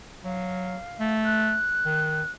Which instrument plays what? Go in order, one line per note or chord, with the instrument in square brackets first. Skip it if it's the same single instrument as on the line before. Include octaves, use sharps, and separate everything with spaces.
[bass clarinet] F#3 [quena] F5
[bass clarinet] A3
[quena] F#6
[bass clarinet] D#3